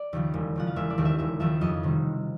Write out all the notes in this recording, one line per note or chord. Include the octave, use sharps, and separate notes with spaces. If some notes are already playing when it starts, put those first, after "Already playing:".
Already playing: D5
D#2 C#3 F3
E1
D#2 C#3 F3 F#5
F5
E1 E5
D5
D#2 C#3 F3
E5
E1 E5
D#2 C#3 F3 E5
F2 D#5
C3 D#3 G3